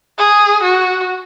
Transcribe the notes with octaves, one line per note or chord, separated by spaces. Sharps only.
G#4
F#4